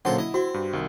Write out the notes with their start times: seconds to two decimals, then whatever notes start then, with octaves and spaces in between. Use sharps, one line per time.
0.05 A#2 D3 F#3 C#4 A4 C5 F#5
0.18 E4 D#5
0.34 C4 F#4
0.54 G2
0.73 C2 D#3